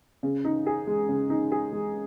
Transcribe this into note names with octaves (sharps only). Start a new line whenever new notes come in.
C#3
D#4
G#4
G#3
C#3
D#4
G#4
G#3